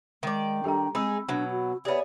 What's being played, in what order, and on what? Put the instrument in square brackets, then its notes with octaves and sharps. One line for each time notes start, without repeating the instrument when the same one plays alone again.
[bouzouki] D#3 D5 [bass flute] G#3
[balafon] G3 G4 A4 [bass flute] D4 [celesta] G5 A#5
[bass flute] G#3 [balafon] C4 [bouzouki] D#4 G#4 [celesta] B5 E6
[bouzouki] B2 F#3 [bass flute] D4
[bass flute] F#4
[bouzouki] B3 G#4 [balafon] G4 C#5 E5 [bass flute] D5